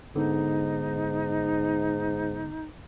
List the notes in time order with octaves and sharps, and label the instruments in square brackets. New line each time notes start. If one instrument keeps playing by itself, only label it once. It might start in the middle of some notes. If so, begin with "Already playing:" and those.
[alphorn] G#2 [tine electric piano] D3 B3 [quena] D#4